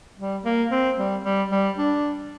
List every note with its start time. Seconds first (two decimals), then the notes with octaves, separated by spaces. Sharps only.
0.19 G3
0.45 A#3
0.71 C4
0.98 G3
1.24 G3
1.52 G3
1.78 D4